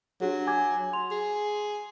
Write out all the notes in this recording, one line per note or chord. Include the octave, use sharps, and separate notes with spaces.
F#3 D4 G4 G#4
G#5 D6 G#6
C6 F7
G#4